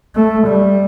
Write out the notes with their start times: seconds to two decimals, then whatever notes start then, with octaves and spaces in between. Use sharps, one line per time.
0.15 A3
0.46 G3